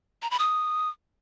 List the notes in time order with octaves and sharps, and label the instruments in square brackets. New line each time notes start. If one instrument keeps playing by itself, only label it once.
[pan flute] A#5
B5
D#6